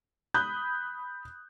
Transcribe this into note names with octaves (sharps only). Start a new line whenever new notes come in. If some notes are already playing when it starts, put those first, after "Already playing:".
B5 D#6 F#6 G6